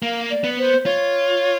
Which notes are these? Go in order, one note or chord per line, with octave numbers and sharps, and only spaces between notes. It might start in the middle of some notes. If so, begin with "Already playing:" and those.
A#3 F5
D5
B3
C5
F4 C#5